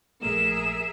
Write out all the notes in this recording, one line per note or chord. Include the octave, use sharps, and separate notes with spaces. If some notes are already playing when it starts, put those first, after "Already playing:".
A#1 A3 A#3 G#4 A#4 E5 E7